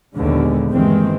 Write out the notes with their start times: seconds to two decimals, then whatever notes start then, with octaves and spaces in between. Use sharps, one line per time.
0.16 A#1 D#2 D3 G#3 B3
0.71 G1 D#2 D#3 E3 G#3 C4